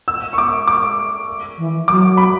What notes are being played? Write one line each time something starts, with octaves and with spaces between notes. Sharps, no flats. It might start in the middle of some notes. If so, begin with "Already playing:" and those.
E6
C#6
D6
D6
E3
F#3 D6
B5